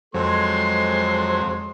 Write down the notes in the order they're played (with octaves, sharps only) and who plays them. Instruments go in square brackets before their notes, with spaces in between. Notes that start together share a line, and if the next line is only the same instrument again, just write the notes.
[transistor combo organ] F2 F#3 [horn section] G#3 A4 C6 [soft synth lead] C5